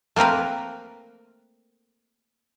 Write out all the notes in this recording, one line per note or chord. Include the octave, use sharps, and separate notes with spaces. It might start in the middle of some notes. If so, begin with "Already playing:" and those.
A3 A#3 C4 A#4 B4